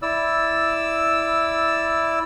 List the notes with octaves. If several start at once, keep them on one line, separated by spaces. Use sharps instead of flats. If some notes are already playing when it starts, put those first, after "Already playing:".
E4 D5 E6